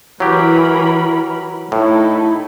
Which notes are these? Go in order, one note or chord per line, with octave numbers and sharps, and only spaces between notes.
E3 F#3 G4 A#4 B5
A2 D#4 E4 A4